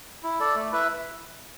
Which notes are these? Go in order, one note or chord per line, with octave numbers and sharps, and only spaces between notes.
E4
A4 D5
A3
E4 B4 E5